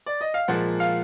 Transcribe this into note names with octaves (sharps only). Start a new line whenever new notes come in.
D5
D#5
F5
A#2 F3 G#3 F#5
F5